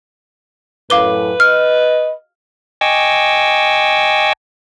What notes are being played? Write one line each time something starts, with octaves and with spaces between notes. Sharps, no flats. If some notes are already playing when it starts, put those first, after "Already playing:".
F#2 A2 B4 F5 D6 G7
D#5 F6
D#5 G5 G#5 C#6 D6 E6